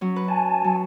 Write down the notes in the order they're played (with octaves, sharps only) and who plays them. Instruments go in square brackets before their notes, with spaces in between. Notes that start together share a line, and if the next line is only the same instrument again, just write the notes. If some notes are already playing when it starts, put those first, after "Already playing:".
[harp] F#3 C#4
B4
[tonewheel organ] G#5 A5
[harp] F#3